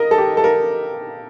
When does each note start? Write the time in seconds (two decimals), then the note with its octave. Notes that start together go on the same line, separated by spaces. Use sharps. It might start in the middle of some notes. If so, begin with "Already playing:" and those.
Already playing: A#4 D#5
0.11 A4
0.18 G4
0.37 A4
0.44 A#4